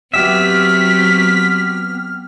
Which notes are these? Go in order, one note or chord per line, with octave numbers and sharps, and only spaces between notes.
F#3 B3 C4 G4 E5 F6 B6